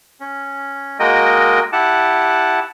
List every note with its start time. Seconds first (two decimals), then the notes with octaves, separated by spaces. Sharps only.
0.20 C#4
1.00 G#3 A#3 F#4 A#4 D#5 G5
1.72 E4 G4 F#5 A5